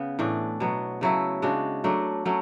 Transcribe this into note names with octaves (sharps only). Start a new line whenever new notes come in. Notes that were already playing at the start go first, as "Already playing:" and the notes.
Already playing: C#3 B3
A2 E3 A3 D4
B2 F#3 B3
C#3 F#3 A3 E4
C#3 G#3 D4 F#4
F#3 A3 D4
F#3 A3 C#4